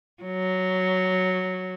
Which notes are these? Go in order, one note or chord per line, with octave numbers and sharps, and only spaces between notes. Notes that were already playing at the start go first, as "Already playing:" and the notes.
F#3